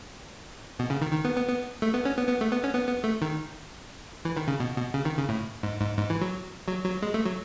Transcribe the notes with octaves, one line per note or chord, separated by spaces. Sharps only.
B2
C#3
D#3
D#3
B3
B3
B3
A3
B3
C#4
B3
B3
A3
B3
C#4
B3
B3
A3
D#3
E3
D#3
C#3
B2
B2
C#3
D#3
C#3
A2
G#2
G#2
G#2
E3
F#3
F#3
F#3
G#3
A3
F#3